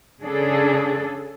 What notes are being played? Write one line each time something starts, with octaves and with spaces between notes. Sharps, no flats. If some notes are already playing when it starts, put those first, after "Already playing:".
C#3 D4 G#4 A4